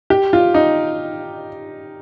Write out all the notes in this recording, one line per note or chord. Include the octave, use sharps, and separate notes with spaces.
G4
F4
D#4